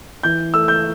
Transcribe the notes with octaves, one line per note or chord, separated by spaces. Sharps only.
E3 G6
A3 E6
G6